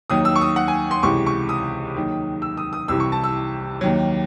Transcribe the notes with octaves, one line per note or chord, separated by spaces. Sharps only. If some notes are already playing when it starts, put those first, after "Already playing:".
D#2 D#3 F#3 D#6
E6
C#6
D#6
F#5
G#5
C6
C#2 C3 E3 C#6
C#6
D#6
D#2 D#3 F#3
E6
D#6
D#6
C2 C3 E3 E6
C#6
A5
E6
D#2 D#3 F#3